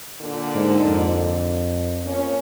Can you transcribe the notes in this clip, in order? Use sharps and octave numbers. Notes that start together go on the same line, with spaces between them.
A#2 D3
G#2
F2
F3 A#3 C#4